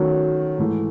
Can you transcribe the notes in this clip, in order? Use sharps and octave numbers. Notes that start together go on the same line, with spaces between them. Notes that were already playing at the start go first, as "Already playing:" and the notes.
Already playing: D#3 F#3 A3 C#4 F#4
G#2 E3 A3